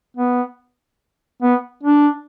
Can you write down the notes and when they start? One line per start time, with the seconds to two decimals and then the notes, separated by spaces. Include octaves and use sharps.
0.17 B3
1.43 B3
1.83 D4